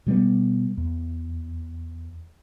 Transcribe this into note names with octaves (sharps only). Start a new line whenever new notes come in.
B2 G3 A3 B3
E2